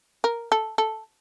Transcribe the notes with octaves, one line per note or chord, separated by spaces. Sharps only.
A#4
A4
A4